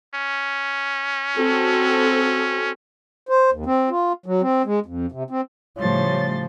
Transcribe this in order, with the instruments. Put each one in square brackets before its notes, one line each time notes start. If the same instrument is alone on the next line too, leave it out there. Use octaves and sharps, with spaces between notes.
[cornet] C#4
[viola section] C4 F#4 A4
[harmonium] C5
D#2
C4
F4
F#3
C4
G#3
F2
C3
C4
[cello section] A2 [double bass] C#3 F3 [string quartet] G3 C6 A6 [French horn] C#5